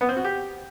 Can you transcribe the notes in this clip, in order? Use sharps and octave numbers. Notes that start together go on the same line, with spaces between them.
B3
C4
F#4
G4